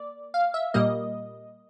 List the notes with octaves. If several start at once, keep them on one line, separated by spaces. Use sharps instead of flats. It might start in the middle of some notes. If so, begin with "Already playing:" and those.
Already playing: A#3 D5
F5
E5
A#2 G3 A#3 D#5